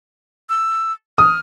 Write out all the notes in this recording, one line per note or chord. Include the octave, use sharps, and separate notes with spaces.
E6
D#6 F6